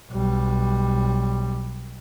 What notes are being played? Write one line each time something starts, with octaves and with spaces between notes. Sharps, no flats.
B1 G3